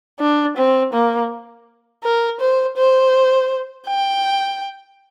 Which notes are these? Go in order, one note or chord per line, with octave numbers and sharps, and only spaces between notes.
D4
C4
A#3
A#4
C5
C5
G5